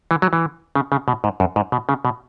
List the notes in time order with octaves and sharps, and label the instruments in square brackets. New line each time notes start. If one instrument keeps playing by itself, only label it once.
[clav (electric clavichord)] E3
F#3
E3
C#3
C#3
B2
G#2
F#2
G#2
B2
C#3
B2